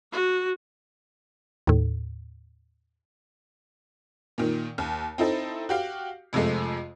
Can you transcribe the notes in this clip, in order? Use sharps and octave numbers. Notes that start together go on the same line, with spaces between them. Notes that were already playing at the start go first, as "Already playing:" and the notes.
F#4
D#2 A2
A#2 D#3
D#2
C4 D#4 E4 A4
F#4 G4 F5
F2 C3 F3 G#3 A3